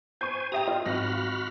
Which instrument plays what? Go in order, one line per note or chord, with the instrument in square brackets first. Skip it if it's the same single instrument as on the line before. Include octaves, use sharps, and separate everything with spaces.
[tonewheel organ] C5 G#5 [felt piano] C#6 G6
[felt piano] G4 E5 G5 [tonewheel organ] A#5 D#6
[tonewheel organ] F4 [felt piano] D#5
[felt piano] G#1 A#6 [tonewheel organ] F#4 B5 F6